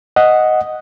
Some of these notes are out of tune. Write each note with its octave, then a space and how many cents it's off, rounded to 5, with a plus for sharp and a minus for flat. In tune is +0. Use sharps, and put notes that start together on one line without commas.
D#5 +0 F#5 +0